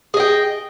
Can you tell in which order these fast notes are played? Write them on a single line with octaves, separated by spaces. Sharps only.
G#4 D#5 G5